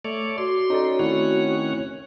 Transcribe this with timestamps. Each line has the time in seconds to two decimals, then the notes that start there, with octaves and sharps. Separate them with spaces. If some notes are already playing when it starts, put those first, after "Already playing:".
0.05 A3 A4 C#5 D5
0.38 F#4 C6 D6
0.70 C#4 D#4 A4 D5
0.99 D#3 A3 C4 E4 C#5 F#5